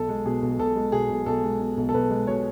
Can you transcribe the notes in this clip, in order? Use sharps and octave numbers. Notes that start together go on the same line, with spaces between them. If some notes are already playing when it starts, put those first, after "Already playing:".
Already playing: B1 A4
G#3
B2 G#4
B1
B1 A4
G#3
B2 G#4
B1
B1 A4
G#3
B2
B1
A4
B1 B4
G#3
B2 C#5